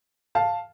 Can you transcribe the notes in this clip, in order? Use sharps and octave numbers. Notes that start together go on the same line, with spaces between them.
F5 A5